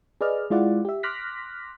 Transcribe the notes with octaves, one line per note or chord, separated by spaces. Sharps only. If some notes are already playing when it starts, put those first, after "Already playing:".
G#4 B4 D5 D#5 F6
G#3 E4 F4 D5 F5 F#5
G4 E5
C6 D6 F6 F#6 A#6 B6